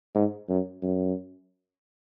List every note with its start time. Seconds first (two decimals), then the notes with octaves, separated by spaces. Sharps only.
0.15 G#2
0.49 F#2
0.83 F#2